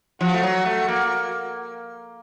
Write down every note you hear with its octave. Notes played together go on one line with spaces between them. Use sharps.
F3 F#4
A3
F#3
A3
A#3